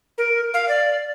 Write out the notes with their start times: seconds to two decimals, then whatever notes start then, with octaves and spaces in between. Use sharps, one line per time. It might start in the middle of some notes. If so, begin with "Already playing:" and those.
0.18 A#4
0.54 F5
0.69 D5